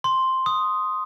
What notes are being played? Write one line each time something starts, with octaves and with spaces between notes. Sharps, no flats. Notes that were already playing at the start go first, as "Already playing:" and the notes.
C6
D#6